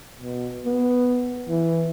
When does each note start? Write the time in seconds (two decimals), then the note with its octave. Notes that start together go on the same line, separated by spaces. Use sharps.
0.19 B2
0.65 B3
1.49 E3